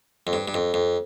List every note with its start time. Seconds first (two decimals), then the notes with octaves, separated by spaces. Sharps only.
0.27 F2
0.33 G2
0.48 G2
0.54 F2
0.74 F2